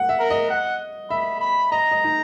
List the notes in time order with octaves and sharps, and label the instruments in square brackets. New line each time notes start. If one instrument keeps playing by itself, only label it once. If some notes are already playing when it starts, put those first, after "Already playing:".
Already playing: [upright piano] F#5
E5
[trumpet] A#4
[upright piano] D#5
[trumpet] F#5
[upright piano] E5 [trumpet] B5
[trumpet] B5
[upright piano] D#5 [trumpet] A#5
[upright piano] D#5
D#4